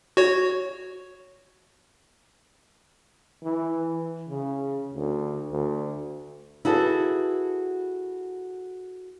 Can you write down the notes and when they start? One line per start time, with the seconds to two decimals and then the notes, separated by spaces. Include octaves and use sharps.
0.17 F#4 C#5
3.43 E3
4.29 C#3
4.94 D2
5.52 D2
6.65 E4 F#4 G#4 A4 B4